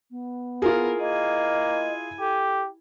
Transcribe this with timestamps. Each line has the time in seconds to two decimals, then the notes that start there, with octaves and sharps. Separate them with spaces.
0.11 B3
0.62 E4 F4 G#4 A#4
0.99 A#3 E4 D#5 G#5
2.20 G4 A4